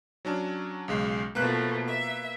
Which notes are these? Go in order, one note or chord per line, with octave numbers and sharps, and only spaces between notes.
F#3 C#4 D4
B1 C#3 G#3
B2 F3 A3 A#3 B4 F#6
E5